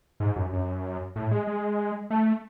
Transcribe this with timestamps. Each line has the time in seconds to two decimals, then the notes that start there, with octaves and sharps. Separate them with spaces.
0.20 G#2
0.36 F#2
0.53 F#2
1.16 A2
1.31 G#3
1.47 G#3
2.10 A3